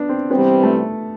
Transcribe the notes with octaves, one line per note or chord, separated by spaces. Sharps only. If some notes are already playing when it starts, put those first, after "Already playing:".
Already playing: B3 D4
C4
C3 E3 G3 B3 C4
A3